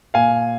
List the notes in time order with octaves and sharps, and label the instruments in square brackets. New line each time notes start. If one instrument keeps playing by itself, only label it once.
[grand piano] A#2 F5 G#5